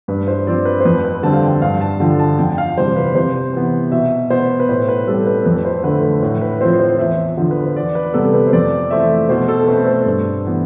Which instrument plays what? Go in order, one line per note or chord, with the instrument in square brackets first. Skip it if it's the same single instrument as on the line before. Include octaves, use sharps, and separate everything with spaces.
[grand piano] G2 B4
C5
F3 C4 D5
B4
C5
F2 B4
B4
D3 G3 C4 A5
F5
G5
G2 F5
A5
D3 F3 G5
A5
F2 G5
G5
F5
C3 E3 G3 C5
B4
C3 C5
E3 B3
B2 E5
B3 C5
B4
A2 C5
B4
G3 C4 A4
B4
F2 B4
B4
C5
D3 A3 B4
B4
A2
B4
F3 C4 C5
C5
E2 E5
D3 F3
B4
C5
E2 D5
B4
C3 G3 B3 A4
B4
C5
F2 D5
E3 A3 C4 E5
B2 C5
A4
A3 C4 B4
C5
G2
E3 B3